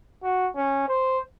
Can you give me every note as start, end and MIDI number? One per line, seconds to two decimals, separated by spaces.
0.23 0.49 66
0.56 0.84 61
0.89 1.20 72